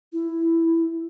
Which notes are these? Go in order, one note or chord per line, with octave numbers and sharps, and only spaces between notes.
E4